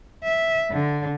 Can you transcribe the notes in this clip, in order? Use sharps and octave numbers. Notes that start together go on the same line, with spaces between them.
E5
D3